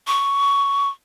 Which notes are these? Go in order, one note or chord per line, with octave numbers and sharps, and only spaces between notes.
C#6